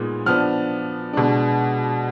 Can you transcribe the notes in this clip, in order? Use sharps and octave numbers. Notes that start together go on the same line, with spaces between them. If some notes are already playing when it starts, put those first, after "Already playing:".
Already playing: A#2 G#3 B3 D#4
F3 B3 D4 F6
B2 G#3 D4